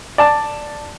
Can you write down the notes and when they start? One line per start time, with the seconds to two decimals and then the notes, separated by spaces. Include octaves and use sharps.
0.18 D5 A5